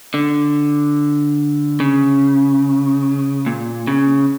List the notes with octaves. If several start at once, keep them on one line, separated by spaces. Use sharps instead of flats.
D3
C#3
A#2
C#3